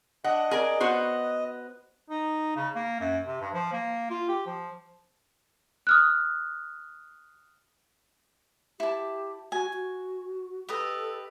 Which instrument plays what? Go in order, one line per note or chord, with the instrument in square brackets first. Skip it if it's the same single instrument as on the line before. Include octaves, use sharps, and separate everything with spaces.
[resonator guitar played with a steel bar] D4 F#5 [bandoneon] D#5
[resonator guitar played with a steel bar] G#4 A#4 D5
B3 F#4 C5
[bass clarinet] D#4
C#3
A#3
F#2
C3
G2
F3
A#3
F4
G4
F3
[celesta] D#6 F6 F#6
[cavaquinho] E4 A5 [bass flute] G4
[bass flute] F#4 [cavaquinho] G#5
[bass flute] F#4
[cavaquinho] G4 B4 D#5 [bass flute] A4